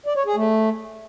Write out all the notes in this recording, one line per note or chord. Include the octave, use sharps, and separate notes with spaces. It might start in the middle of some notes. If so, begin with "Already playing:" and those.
D5
C#5
G#4
A3